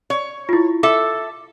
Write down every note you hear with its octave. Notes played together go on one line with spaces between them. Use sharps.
C#5
E4 F4
A4 E5 D6